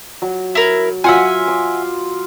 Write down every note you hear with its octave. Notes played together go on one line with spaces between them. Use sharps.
F#3
E4 A#4
F#3 F4 E5 F#5 G#5
D6